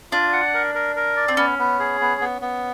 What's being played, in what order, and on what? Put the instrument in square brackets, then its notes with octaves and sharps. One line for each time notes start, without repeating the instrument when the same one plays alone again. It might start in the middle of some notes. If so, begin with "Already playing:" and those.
[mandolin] D4 [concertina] F4
[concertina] F#5
A#4
A#4
A#4
D5
[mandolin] C4
[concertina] B3 [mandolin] C#4
[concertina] B3
G#4
B3
B3
B3